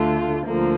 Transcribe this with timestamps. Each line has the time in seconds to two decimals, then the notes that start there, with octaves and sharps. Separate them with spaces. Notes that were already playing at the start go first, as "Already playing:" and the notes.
Already playing: D2 D3 A3 F4
0.45 D2 D3 F3 A#3